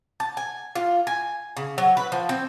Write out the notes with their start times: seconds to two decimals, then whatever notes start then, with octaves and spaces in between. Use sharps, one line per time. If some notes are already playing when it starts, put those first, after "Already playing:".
0.20 A5
0.37 G#5
0.75 F4
1.07 G#5
1.57 C#3
1.78 F#3
1.97 B4
2.12 F3
2.29 C4